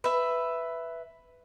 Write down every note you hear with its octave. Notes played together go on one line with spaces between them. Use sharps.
B4 E5